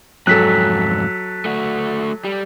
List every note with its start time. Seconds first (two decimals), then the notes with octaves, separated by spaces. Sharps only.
0.27 F2 G#2 F#3 A4 F#6 B6
1.45 A3 F#4
2.25 G3